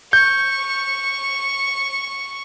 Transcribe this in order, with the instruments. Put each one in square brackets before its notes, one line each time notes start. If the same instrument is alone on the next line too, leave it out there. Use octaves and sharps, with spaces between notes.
[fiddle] C#6 [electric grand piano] G6